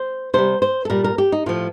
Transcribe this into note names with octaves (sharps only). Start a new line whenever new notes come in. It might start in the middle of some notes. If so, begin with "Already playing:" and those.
Already playing: C5
C3 G3 C5
C5
A4
A#2 G3 A#4
A#4
G4
D#4
A2 F3 F4